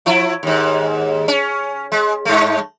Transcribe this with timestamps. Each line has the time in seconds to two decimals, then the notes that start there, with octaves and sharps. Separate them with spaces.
0.06 F3 E4
0.43 D#2 G#2
1.28 C#4
1.92 G#3
2.25 G2 A3